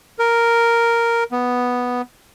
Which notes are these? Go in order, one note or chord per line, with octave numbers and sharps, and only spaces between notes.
A#4
B3